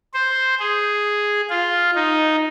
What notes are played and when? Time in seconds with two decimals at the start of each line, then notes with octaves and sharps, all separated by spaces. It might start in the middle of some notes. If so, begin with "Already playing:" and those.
0.14 C5
0.60 G#4
1.50 F4
1.95 D#4